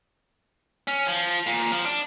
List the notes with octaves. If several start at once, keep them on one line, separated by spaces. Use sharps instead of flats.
C#4
F3
A#2
F3
D4